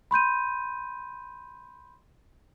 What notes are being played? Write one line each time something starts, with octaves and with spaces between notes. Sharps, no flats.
B5 C6 G6 D#7